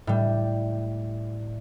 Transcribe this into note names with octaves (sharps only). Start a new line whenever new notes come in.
A2 G3